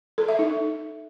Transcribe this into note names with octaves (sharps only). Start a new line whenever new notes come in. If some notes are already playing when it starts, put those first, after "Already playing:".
A4
E5
D#4